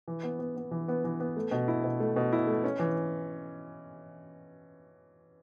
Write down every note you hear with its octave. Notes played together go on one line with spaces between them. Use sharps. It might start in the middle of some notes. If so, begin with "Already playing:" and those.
E3
B3
B3
B3
E3
B3
E3
B3
A3
B2
E4
B2
A3
B2
E4
A3
C#4
E3